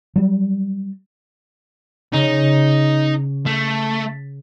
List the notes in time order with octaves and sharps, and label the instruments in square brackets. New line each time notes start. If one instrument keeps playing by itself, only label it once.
[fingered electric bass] F#3 G3
[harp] C#3 [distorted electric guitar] D#4
[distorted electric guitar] A3